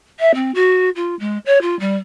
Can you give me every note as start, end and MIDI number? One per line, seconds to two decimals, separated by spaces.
0.20 0.32 76
0.34 0.51 60
0.55 0.90 66
0.96 1.15 65
1.20 1.38 56
1.46 1.61 73
1.61 1.78 65
1.80 1.96 55